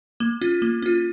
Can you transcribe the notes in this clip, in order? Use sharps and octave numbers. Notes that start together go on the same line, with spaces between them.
A#3
C#4 F4
A#3
C#4 F4